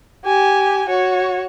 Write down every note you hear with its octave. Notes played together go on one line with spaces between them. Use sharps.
G4 G#5
F#4 C#5